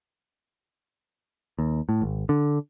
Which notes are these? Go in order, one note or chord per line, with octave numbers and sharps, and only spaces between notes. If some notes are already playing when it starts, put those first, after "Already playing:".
D#2
A2
G#1
D3